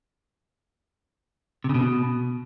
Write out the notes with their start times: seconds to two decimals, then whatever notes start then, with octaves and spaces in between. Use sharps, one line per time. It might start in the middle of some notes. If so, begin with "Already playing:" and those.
1.64 C3
1.69 C#3
1.74 B2